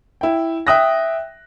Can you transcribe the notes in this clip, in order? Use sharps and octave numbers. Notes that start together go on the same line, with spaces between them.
E4 G5
E5 G5 D#6 F#6 A#6